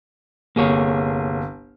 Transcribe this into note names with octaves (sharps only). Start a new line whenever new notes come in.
G1 C2 A#3 G#4 C#5